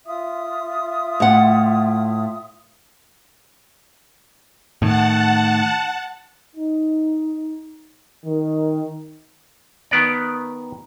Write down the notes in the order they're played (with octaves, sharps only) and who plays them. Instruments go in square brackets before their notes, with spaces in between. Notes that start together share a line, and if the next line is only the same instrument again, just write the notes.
[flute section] F4 E5 D#6
[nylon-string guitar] A2 F#5
[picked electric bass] A2 D#3 [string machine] F#5 A5
[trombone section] D#4
D#3
[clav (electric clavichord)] D#3 B3 D5